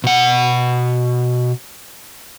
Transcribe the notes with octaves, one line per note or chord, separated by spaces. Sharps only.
B2 F#5